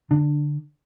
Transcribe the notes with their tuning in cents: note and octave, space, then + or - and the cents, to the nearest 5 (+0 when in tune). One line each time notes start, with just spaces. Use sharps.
D3 +0 D4 +20